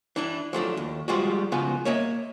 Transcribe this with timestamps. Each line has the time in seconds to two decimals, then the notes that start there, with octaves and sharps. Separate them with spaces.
0.16 E3 D4 E4
0.53 F3 F#3 A3 D4
0.77 D#2
1.08 F3 G3 G#3 F4 F#4
1.52 C#3 F3 B3 F4 F#4
1.85 A#3 C#5 D#5 E5